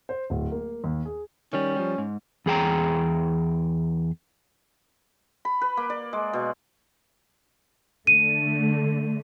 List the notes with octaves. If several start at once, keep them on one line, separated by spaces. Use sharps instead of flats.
C5
D1
A#3
D#2
G#4
D#3 G3 C#4
F3 G3
G#2
E2 G#4 G5 A#5
B5
B4
A#3
D5
G#3
B2
D3 A3 D#7